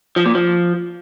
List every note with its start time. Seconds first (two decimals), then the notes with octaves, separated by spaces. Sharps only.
0.16 F3
0.26 A#2
0.35 F3